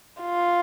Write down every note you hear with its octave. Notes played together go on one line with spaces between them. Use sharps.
F4